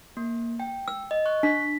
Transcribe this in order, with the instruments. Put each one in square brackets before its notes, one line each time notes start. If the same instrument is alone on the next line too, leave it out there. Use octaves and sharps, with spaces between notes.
[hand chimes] A#3
G5
[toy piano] E6
[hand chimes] D#5
C#6 F#6
[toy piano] D4 [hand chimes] B6